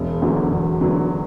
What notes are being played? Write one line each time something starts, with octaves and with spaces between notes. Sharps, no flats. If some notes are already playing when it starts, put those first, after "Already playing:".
Already playing: E1
E2 D3 F#3
E1
E2 D3 F#3